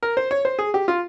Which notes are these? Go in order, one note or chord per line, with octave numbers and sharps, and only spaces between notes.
A#4
C5
C#5
C5
G#4
G4
F4